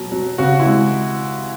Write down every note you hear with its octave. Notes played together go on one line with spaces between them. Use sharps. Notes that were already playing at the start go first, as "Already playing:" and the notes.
Already playing: B2 F#3
F#3
C#3 F#4
E4
G#3